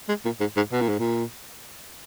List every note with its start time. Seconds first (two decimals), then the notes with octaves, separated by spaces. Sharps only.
0.08 G#3
0.25 A#2
0.40 G#2
0.56 G#2
0.72 B2
0.81 A#2
0.89 G#2
0.99 A#2